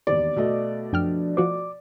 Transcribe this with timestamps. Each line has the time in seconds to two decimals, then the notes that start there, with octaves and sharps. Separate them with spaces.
0.07 E1 D#2 D5
0.36 B2 A3 D#5
0.93 F#2 F3 D4 G5 F6
1.37 F3 F#4 C5 D6